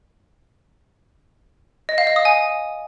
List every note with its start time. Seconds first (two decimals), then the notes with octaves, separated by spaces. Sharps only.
1.89 D#5
1.98 F5
2.07 D#5
2.16 D#6
2.25 G#5